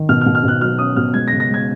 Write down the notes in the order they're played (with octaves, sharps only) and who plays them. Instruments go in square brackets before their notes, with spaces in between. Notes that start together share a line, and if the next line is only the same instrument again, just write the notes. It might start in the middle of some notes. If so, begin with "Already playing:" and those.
Already playing: [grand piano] D#3
B2 F6
F6
B2
F6
B2 F#6
F#3 F6
C#4 D#6
B2 F6
G#3 G#6
A#6
C#3
A#6
G#3 G#6